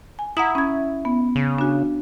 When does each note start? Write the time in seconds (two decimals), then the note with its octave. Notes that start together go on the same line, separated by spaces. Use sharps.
0.19 G#5
0.37 E4 F#5 A#5 D#6
0.55 C#4 G#6
1.05 B3
1.36 C#3
1.58 D4 F#4